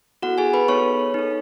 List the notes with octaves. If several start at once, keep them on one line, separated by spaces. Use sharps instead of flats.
B3 E4 F#4 A4 F#5
G#4 G#5
B4 B5
B3 D#4 A4 C#5 C#6
D#4 A4